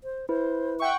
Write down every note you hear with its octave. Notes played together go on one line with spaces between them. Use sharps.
C5
E4 B4 C5
E5 F#5 G5 C#6